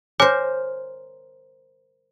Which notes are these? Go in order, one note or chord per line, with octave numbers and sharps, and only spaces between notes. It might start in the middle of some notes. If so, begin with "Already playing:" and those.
A#4 C5 C#5 G#5 D6